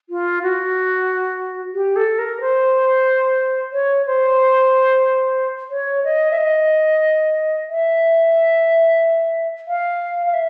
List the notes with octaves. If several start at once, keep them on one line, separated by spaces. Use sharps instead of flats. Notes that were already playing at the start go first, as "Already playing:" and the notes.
F4
F#4
G4
A4
A#4
C5
C#5
C5
C#5
D#5
E5
D#5
E5
F5
F5
E5